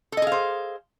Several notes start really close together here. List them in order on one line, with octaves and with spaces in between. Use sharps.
A4 D#5 G#4 F5 C5